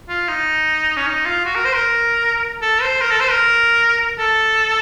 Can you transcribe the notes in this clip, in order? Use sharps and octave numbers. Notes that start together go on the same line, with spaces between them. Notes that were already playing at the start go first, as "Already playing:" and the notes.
F4
D#4
C#4
D#4
F4
F#4
A#4
C5
A#4
A4
C5
A#4
A4
C5
A#4
A4